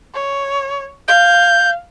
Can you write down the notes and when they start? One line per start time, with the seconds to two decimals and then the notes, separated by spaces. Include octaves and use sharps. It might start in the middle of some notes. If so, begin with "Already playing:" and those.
0.14 C#5
1.08 F5 G6